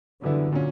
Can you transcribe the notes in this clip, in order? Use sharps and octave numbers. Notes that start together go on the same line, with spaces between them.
F#2 D3 E3 G3 B3 E4
A#2 F#3 C#4